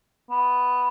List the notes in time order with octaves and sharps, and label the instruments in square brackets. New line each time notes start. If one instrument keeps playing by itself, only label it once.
[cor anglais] B3